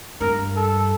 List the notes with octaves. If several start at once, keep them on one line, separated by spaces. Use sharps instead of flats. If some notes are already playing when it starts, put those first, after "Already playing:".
G2 A#4
A4